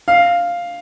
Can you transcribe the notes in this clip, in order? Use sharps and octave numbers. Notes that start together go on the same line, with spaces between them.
F5